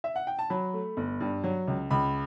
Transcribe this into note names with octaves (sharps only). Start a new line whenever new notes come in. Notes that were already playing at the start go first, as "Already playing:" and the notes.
E5
F#5
G5
A5
F#3 B5
A3
G1
G2
F#3
C#2
C#2 B5